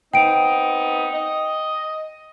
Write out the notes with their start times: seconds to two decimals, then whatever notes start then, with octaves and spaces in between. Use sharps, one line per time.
0.14 B3 C4 D#4 G5 D7
1.13 D#5